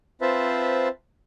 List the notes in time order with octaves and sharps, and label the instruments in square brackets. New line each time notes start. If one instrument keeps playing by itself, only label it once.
[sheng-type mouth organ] C4 F4 B4 C5 E5 A5